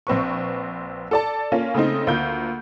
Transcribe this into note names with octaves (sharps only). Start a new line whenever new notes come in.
A#1 C4 B4 C#6
A4 D5 A5
A#3 C#4 F4
C#3 A3 C4 D#4
D2 A#3 F4 G6